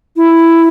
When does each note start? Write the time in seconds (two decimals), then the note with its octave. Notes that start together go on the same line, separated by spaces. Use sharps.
0.16 E4